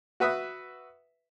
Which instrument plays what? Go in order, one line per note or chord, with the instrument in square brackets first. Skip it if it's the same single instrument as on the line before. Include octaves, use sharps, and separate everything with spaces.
[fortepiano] F#4 B4 E5 D#6